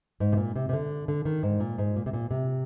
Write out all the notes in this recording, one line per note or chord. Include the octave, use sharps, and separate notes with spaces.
G#2
C3
A#2
C3
C3
D3
D3
D#3
G#2
A#2
G#2
A#2
C3
A#2
C3